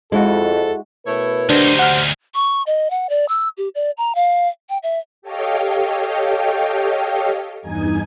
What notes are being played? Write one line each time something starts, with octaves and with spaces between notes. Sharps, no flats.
F2 G#3 E4 F#4 A4
B2 A3 E4 A#4 B4 C#5
D2 F#3 D4 D#4 G4 C5
F#5 F6
C#6
D#5
F#5
D5
E6
G4
D5
A#5
F5
G5
E5
G4 A4 C#5 D#5 F5 G5
E2 G2 D#4 G#5 G#6